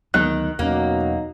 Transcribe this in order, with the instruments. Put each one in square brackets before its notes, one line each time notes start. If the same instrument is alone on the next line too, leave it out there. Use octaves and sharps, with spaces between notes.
[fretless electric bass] D2 F#3 B3 [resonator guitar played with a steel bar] D#3 [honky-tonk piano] F#6
[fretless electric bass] E2 C#4 [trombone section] B2 F#3 D#4 [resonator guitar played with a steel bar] A#3